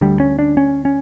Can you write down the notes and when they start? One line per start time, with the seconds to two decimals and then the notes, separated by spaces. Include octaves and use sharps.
0.01 D2 D3 G3
0.20 C#4
0.39 D4
0.57 C#4
0.85 C#4